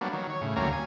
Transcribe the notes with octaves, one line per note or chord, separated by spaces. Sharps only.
F#3 G3 A#3 B3 D4
D#3 F#3
C#5
A2 C#3
D2 F#3 G3 A#3 C#4 A#5
G#5